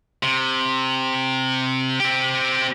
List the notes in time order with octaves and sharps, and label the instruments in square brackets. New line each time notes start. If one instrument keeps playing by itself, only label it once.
[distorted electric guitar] C3
C4 G4